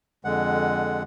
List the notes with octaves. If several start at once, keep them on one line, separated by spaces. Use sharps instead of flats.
F2 D3 G#3 F#5